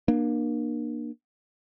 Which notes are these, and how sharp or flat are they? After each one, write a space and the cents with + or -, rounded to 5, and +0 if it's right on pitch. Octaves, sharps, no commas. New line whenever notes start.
A#3 +20 D4 +30